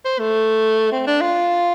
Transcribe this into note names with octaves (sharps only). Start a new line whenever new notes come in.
C5
A3
C4
D4
F4